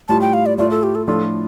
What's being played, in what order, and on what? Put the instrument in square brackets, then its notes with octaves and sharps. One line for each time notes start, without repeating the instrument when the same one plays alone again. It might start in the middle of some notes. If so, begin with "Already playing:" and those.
[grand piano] A2 G3 F4 [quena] A5
[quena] G5
F5
D5
[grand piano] A2 A3 F4 [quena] D5
[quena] A4
G4
A4
[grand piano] A2 F3 D4 F4 [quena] A4